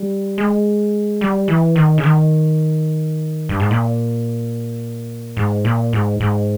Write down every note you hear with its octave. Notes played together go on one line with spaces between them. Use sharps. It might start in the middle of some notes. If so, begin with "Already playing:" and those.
Already playing: G3
G#3
G3
E3
D#3
C#3
D#3
G2
G#2
A#2
G#2
A#2
G#2
G#2